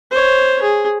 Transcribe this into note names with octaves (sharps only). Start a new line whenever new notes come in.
C5 C#5
G#4